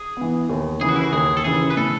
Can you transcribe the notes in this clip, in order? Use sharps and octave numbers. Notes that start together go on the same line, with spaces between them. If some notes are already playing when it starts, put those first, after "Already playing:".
Already playing: G#4
E3 B3
D#2
C#3 E3 G#4
F#4
E4
F#4
D#2 G#4
A4
C#3 E3 G#4
B4
A2 A4